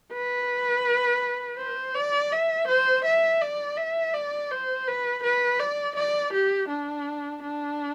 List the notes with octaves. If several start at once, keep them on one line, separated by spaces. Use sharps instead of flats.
B4
C5
D5
E5
C5
E5
D5
E5
D5
C5
B4
B4
D5
D5
G4
D4
D4